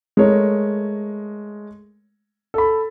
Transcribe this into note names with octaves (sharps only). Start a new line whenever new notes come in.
G#3 A3 A#4 C#5
A4 B5